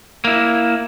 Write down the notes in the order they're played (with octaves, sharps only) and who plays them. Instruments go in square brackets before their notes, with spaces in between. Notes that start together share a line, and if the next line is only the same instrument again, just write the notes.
[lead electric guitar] A#3 E4